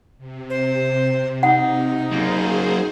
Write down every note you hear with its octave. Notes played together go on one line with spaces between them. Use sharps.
C3
C5
D#4 F#5
F#2 A#3 G#4 C5